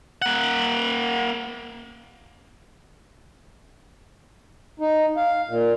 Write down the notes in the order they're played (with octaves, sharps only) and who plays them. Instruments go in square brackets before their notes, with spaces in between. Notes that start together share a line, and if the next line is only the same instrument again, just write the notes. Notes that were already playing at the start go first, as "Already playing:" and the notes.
[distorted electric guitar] A#3 F#5
[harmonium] D#4
F5
A#2